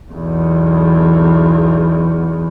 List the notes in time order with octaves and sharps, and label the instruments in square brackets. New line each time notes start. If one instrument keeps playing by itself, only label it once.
[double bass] B1 E2